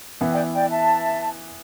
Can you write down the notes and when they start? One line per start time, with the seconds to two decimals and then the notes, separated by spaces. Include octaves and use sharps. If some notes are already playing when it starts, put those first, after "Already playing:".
0.21 E3 B3 E4
0.32 D5 G5
0.53 D5 G5
0.70 E5 A5